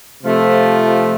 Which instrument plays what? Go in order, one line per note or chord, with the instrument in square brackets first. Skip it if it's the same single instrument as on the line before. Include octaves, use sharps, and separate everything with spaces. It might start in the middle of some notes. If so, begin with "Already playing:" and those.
[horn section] C3 F3 A3